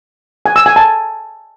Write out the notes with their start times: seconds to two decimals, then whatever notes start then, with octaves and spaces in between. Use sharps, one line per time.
0.46 G#5
0.56 E6
0.66 G#5
0.76 A5